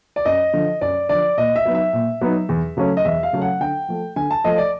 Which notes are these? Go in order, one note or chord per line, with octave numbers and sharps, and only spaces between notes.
D5
F#2 D#5
D3 F3
F#2 D5
D3 F3 D5
A#2 D#5
E5
F#3 B3 D#4
E5
A#2
F#3 B3 D#4
E2
C#3 F#3 A3 C#4
D#5
E2 E5
F5
C#3 F#3 A3 C#4
F#5
D3 G5
F3 A3
D3 G#5
A5
F3 A3 D#5
D5